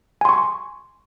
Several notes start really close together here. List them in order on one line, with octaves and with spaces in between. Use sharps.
G#5 C6 C#6